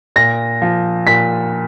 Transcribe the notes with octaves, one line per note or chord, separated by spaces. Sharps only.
A#2 A#6
F3
A#2 B6